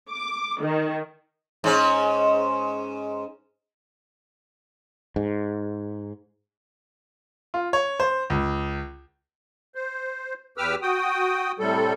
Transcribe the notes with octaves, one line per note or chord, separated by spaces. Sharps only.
D6
D#3
G#2 C#4
G#2
F4
C#5
C5
C#2
C5
E2 G4 B4 D6 E6 F6
F#4 G5 D#6
A2 C3 G3 A4